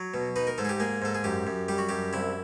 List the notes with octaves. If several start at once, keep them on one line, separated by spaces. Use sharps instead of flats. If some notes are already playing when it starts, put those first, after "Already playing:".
Already playing: F#3
B2
D#4 B4
A#4
G#2 A4
G#4
G4
A#3 G#4
G#2 A4
G#4
F#2 G4
F#2
G3 G4
F#4
F#2 G4
C2 E4